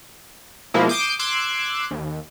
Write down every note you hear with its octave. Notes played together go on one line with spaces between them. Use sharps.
B2 F3 G#3 A#3 E4
D6 D#6 G6 C7 D7 E7
C6 D6 E6 F#6 G#6
D#2